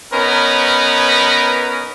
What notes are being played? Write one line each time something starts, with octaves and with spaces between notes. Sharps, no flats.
B3 C#4 D#4 A#4 B4